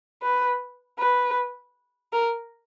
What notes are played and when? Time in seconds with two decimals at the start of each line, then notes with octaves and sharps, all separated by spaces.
0.22 B4
0.99 B4
2.13 A#4